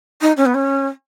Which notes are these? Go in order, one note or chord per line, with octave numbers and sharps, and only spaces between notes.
D#4
C#4
B3
C#4